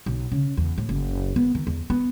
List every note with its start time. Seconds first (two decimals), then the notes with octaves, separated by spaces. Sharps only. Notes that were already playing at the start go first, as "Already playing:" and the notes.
0.06 B1
0.32 C#3
0.57 E2
0.78 A2
0.89 F#1
1.36 B3
1.55 D#3
1.67 E2
1.90 B3